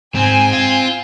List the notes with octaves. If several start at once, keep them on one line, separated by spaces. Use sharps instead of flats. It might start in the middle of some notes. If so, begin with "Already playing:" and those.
G#2 C4 G#5
F4